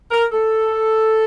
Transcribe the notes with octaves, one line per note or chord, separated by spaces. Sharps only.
A#4
A4